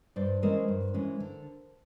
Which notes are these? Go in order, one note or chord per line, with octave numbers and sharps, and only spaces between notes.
G2 C5 D5
E3 G#3 C#4 A#4 C5
G2
E3 G#3 C#4
D3